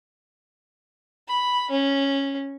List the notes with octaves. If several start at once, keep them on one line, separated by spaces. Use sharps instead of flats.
B5
C#4